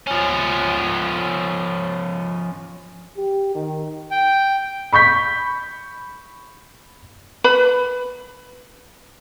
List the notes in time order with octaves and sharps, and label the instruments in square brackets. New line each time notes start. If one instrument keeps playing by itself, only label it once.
[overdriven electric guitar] F3 C#4
[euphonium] G4
D#3
[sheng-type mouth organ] G5
[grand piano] B5 C#6 G6 B6
[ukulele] B4 B5